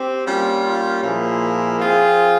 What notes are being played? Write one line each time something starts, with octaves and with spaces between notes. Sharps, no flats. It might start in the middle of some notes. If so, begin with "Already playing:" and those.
Already playing: C4 G4
G3 A#3 C#4 F4
A#2 F3 A#3 E4 G#4
F3 C4 F4 G#4